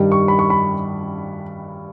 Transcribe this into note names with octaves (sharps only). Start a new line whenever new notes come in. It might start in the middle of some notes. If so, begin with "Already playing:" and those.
Already playing: G2 D#3 G3
C#6
B5
C#6
B5